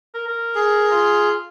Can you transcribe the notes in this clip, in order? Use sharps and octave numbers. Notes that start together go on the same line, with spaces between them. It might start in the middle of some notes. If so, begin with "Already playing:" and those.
A#4
A#4
G#4
F4